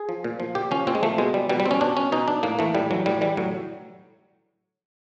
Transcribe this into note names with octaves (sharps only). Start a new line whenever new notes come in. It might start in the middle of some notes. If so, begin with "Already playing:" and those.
Already playing: G#4
F3
A#2
F3
A#2 G4
F3 C#4
A#2 C4
G#3
F3 A3
B2 G#3
G3
B2 G3
G3
C4
C#4
B2 D4
C#4
B2 D#4
D4
A2 A#3
E3 A3
A2 G3
E3 F#3
A2 G3
E3 G3
A2 F#3